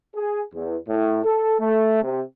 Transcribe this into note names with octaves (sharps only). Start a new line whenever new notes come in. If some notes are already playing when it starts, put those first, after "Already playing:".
G#4
E2
A2
A4
A3
C3